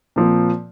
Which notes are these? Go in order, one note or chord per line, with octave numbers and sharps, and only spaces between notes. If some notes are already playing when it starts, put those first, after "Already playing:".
A#2 F3 C4